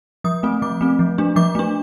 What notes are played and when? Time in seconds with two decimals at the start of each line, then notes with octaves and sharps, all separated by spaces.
0.24 F3 D#6
0.43 A3 C4
0.62 F3 D6
0.81 A3 C4
0.99 F3
1.18 A3 D4
1.36 F3 D6
1.55 A3 D4